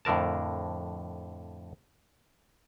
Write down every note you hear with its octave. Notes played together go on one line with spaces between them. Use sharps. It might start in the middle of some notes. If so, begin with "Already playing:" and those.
F2 A2 D3 A#4 A5